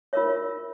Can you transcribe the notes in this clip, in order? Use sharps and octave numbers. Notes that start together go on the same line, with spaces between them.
F4 A#4 C#5 E5